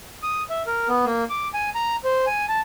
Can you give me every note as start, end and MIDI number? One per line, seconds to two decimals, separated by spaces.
0.23 0.43 87
0.50 0.62 76
0.67 0.88 70
0.88 1.05 59
1.06 1.24 58
1.30 1.48 86
1.54 1.70 80
1.75 1.96 82
2.04 2.25 72
2.27 2.45 80
2.49 2.61 81